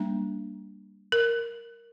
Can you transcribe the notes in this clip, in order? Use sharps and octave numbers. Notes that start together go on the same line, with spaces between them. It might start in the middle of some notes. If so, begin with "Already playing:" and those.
Already playing: G3 A#3 D4
A#4